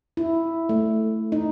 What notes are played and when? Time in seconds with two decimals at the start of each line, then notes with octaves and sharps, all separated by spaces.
0.17 E4
0.69 A3
1.32 D#4